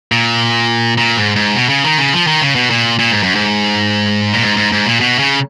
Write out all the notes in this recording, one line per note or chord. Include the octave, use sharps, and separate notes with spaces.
A#2
A#2
G#2
G#2
B2
C#3
D#3
C#3
F3
D#3
C#3
B2
A#2
A#2
G#2
F#2
G#2
A#2
G#2
G#2
G#2
A#2
B2
C#3